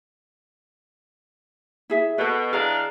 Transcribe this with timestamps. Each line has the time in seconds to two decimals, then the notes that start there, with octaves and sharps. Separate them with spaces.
1.90 E4 G#4 E5
2.18 B2 A4 B4
2.53 E3 D4 G#4 D#5 F5 A#5